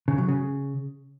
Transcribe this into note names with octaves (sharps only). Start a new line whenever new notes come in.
C#3
F#3
C#3